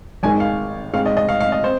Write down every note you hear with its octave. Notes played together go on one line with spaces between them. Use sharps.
G#1 G#2 D#3 G#3 G#5
F5
G#2 G#3 C4 F5
D#5
D#5
F5
F5
D#5
C4 C5